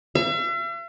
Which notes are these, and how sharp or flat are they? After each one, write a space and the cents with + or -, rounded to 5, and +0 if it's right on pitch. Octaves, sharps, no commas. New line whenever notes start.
E5 +45